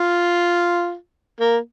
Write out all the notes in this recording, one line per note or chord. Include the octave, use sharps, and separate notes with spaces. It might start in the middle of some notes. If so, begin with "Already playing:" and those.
Already playing: F4
A#3